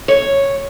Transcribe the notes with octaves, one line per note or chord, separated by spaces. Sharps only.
C#5